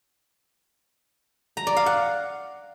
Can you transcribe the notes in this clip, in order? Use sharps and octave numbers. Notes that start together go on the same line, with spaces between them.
A#5
D5
F5
F#5